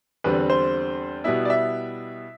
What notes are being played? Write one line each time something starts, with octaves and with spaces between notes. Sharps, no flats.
E2 D3 G3 C4 B4
C5
B2 G3 B3 E4 E5
D5
E5